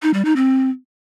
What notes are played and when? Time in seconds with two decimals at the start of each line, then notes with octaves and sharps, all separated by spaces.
0.02 D#4
0.14 G3
0.25 D#4
0.36 C4